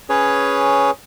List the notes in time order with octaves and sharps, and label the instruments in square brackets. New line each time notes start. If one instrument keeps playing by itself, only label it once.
[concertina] C#4 G#4 B4 C#5